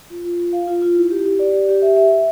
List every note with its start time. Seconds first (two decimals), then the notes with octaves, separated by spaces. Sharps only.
0.10 F4
0.25 F4
0.40 F4
0.53 F5
0.67 F4
0.82 F4
0.97 E4
1.11 G4
1.26 G4
1.39 D5
1.53 G4
1.69 G4
1.82 E5
1.96 E5
2.11 E5